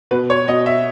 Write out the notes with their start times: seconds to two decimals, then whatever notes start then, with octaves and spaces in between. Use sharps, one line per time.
0.11 B2 B4
0.30 C#5
0.47 B2 D#5
0.66 E5